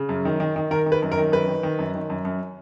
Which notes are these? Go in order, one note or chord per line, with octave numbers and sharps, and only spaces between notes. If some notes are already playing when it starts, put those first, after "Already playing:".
Already playing: C#3
F#2
D#3
D#3
D#3
D#3 A#4
D#3
B4
F#2
A#4
D#3
F#2 B4
D#3
D#3
F#2
D#3
F#2
F#2